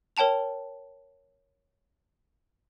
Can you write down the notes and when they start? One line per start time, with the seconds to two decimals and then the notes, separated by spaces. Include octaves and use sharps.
0.17 A#4 C#5 G5 A5 F7